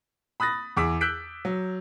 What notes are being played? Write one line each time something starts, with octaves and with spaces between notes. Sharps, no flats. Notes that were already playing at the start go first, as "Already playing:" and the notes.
B5 D#6 F#6 A6 A#6
E2 G#4 D6 E6 B6
E6 F#6 G6 B6 D7
F#3